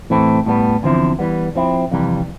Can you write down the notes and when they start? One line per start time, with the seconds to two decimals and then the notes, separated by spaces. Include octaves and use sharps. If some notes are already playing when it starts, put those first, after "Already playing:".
0.10 A2 E3 A3 C4
0.46 A2 G3 B3
0.83 E2 D3 F3 C4 E4
1.19 E3 G3 B3
1.55 F3 C4 E4
1.91 F2 C3 E3 G3